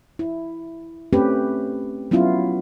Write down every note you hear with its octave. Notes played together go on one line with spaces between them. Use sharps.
E4
A3 C4 C#4 G4 B4
F#3 B3 C#4 E4 F4